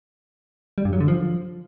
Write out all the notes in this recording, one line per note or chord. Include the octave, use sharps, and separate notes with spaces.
G3
G2
F#3
D3
F3